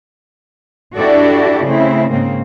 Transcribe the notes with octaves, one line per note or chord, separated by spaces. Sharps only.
D4 E4 F#4 G4 A4 D5
C#3 A3 C4 E4
G#2 C#3 A#3 C4